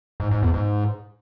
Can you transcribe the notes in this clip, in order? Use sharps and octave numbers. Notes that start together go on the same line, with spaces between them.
G#2
G#2
E2
G#2